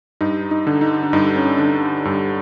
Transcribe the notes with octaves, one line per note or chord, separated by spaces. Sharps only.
G2 D#4
D#4
D3
D#4
D4
G2 D#4
C#4
D3 D4
G2